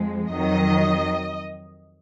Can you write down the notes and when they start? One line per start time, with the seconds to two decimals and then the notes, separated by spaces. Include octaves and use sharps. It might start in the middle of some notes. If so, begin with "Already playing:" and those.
Already playing: F2 F3 G#3
0.31 F2 D#3 F#3 D#5